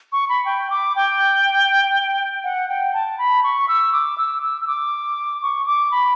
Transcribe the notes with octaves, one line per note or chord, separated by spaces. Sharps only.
C#6
B5
G5
D6
G5
F#5
G5
A5
B5
C#6
E6
D6
E6
E6
E6
D6
C#6
D6
B5